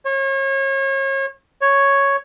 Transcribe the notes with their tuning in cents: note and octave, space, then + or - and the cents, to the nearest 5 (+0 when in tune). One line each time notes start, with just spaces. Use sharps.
C#5 -35
C#5 +0